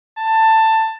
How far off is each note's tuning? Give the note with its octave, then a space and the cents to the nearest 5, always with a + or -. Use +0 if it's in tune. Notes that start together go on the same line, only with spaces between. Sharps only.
A5 +15